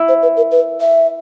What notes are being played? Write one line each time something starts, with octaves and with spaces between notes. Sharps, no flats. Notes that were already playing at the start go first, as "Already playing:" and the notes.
Already playing: E4
C5
B4
A#4
B4
E5